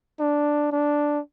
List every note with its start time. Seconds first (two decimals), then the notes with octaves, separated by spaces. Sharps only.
0.20 D4
0.72 D4